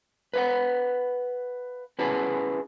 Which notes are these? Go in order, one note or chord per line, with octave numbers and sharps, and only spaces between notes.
B4 F5 F#5
C#4 E4 G#4 B4 F#5 A5